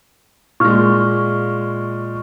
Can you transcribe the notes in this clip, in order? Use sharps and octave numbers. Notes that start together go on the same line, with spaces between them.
A#2 G#3 C#6 F6